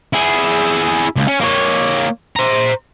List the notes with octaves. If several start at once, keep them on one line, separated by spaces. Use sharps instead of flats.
E4 G#4
C#2
C#4
A#3 C#5
C5 A#5